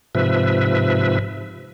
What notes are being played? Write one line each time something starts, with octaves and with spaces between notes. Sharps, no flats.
G#2 C3 F3 B4 E5